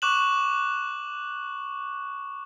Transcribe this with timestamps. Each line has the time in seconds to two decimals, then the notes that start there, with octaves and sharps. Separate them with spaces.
0.02 C#6 D6 F#6 E7 F#7